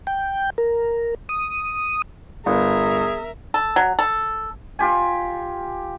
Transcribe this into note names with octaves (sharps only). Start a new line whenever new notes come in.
G5
A#4
D#6
G1 G#4 A#4 E5
A4
F#3
A4
F4 G4 G#5